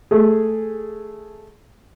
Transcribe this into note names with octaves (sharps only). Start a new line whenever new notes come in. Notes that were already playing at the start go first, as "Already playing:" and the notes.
A3 G#4